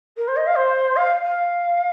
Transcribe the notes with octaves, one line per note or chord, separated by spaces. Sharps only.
A#4
C5
D#5
F5
C5
F5
F5